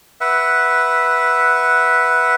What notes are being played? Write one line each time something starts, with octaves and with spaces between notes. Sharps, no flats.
B4 E5 F#5